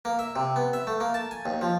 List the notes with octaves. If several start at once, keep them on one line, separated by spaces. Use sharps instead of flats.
A#3
E5
C3
B3
E5
A3
A#3
A5
G#5
D#2
F3